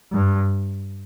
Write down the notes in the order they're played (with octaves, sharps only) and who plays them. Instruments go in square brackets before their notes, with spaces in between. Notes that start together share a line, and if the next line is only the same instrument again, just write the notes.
[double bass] G2